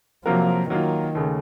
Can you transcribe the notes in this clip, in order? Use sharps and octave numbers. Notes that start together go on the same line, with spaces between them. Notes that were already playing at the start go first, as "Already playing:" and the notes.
C3 F3 F#3 A#3 F4 A#4
D#3 F#3 A#3 F4
D#2 C#3 A3